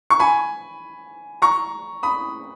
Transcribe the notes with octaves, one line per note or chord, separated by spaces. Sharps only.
C#6
G#5 B5
A#5 C#6
B5 D#6